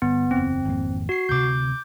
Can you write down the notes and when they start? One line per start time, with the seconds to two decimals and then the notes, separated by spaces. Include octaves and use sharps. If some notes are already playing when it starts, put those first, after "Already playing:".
0.02 G1 B3
0.31 F#1 E2 C4
0.65 G#1 F2 A#3
1.09 F#4 C7
1.29 D2 C3 D6 G6